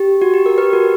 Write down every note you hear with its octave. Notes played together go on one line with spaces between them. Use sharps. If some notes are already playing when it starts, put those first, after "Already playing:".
Already playing: G4
F#4
G4
A#4
G4 B4
F#4 A#4